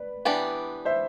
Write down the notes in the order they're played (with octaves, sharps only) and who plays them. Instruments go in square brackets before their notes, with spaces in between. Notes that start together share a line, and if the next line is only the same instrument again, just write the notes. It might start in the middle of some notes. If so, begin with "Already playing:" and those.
Already playing: [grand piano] B4 D5
[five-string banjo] E3 B3 D4 G4
[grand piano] C5 E5